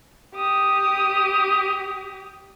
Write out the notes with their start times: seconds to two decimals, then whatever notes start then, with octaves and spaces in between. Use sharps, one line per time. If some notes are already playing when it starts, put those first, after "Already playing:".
0.35 G4 D#6